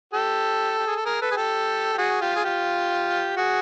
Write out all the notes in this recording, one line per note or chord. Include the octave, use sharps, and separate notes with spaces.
G4 A4
G4
G#4
A4
G#4 A#4
A4 B4
G#4
G4 A4
G4
F#4 G#4
F4 G4
G#4
F4 G4
F#4 G#4